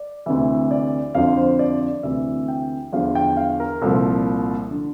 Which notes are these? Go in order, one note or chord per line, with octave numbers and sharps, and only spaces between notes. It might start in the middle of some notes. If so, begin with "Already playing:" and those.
Already playing: D5
D2 C3 E3 E5
D5
F2 D3 F3 F5
C5
D5
D5
D2 C3 E3 E5
G5
E2 D3 F3 F5
G5
F5
A#4
C2 A#2 F3 A4
D3 F3